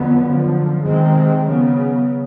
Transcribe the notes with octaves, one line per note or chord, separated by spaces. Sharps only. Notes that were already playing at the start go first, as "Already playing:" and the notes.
Already playing: F2 D3 F#3 B3
F#2 D3 F3
C3 D#3 G#3 C4
C#3 F#3 B3